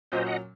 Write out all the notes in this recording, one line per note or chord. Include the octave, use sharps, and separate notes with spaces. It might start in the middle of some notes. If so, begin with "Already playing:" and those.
A#2 F#3 C#4 C5 D#5
D#5 F#5